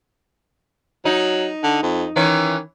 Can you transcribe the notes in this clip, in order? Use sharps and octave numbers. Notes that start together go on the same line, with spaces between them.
F#3 D#4
D3
F2
D#3 E3 C#4